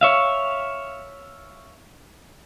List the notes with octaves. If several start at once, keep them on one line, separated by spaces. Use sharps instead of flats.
C#5 E5 F5